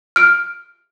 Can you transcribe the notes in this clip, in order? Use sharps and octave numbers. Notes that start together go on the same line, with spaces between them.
F6 D7